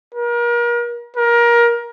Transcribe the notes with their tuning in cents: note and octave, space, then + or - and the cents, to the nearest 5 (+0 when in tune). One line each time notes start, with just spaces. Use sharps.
A#4 +35
A#4 +20